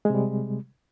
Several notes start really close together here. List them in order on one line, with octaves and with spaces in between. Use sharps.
G#3 C3 G3